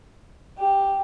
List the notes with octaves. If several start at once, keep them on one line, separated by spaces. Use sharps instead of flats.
G4